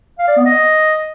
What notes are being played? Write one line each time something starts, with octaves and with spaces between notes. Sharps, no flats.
F5
D5
B3
D#5